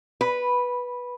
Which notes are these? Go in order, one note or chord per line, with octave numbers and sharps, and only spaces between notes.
B4